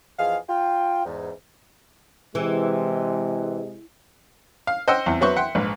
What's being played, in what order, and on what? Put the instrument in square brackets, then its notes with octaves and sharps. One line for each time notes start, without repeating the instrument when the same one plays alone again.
[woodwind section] E2 F3 G#4 D#5 F5
F4 G5
E2 G#2
[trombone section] C3 G#3 [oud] E3
[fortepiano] F5
C5 D#5 F#5 G5 E6
E2 C4 F#5
F#3 B3 B4 C5 E5 C#6
E5 F#5 G5 C6
A#1 G#2 B4